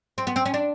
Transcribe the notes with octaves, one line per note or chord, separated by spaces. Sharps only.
C4
B3
C4
C#4
D4